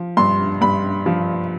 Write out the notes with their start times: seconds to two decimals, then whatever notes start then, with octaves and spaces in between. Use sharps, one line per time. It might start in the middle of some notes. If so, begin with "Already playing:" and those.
Already playing: F3
0.17 G2 C6
0.61 G2 B5
1.06 F3